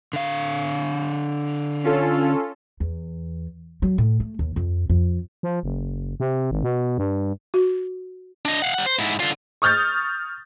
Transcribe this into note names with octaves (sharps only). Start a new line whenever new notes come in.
D3 F5
C#4 F4 A4
E2
F#3
A2
A3
D#2
F2
F2
F3
F#1
C3
G#1
B2
G2
F#4
D4 D#5
F5 F#5
G3 F#5
C5
G#2 E4
D3 F4
C#6 D#6 F6 G6 A6